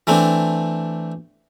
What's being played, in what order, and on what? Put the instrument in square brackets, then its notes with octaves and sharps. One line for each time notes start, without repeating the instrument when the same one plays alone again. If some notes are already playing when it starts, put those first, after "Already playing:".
[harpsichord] E3 A3 C4 D4